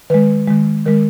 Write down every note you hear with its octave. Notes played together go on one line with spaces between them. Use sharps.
D#3 G#3 B4
D#3 G#3
D#3 G#3 A#4